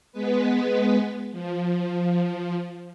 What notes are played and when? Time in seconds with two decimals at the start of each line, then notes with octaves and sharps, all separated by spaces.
0.13 G#3 B3 B4
1.31 F3